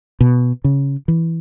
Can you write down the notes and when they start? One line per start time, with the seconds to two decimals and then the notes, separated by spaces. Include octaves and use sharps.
0.20 B2
0.64 C#3
1.08 E3